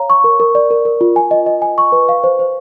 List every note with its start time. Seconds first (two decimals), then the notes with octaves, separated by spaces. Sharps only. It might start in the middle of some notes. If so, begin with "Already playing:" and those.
Already playing: C#5 F5 A#5
0.10 C#6
0.24 A#4
0.40 A#4
0.55 D5
0.71 A#4
0.85 A#4
1.01 F4
1.16 G#5
1.31 D#5
1.46 D#5
1.62 G#5
1.78 C#6
1.92 B4
2.09 F5
2.24 C5
2.39 C5